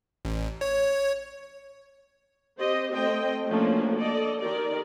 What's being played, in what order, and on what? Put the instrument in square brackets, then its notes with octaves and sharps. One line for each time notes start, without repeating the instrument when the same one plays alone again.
[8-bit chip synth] A1
C#5
[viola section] C4 G4 C5 D#5
A3 C4 C5 D#5 G5
F3 A3 A#3 C#4 D4 F#4
A4 D5 D#5
D#3 G4 A#4 D5